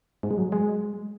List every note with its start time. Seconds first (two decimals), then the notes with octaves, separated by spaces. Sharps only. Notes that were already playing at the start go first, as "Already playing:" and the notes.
0.23 G#2
0.31 G#3
0.38 F#3
0.52 G#3